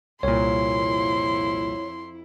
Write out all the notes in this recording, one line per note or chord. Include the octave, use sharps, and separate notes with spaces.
C2 F2 A#2 E4 C#5 C6